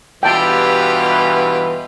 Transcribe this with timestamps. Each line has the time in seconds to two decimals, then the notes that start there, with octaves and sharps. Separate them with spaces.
0.23 G2 B2 E3 F4 G4 B4 G5 A5